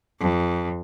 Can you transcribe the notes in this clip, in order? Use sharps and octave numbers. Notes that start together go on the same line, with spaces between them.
F2